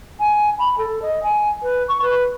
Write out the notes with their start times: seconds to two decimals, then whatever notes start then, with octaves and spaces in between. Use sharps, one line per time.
0.19 G#5
0.59 B5
0.77 A4
1.02 D#5
1.23 G#5
1.62 B4
1.88 C#6
2.02 B4